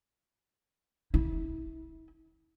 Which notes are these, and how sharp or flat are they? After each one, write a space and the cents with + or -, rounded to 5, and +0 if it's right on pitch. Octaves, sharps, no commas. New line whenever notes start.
E4 -35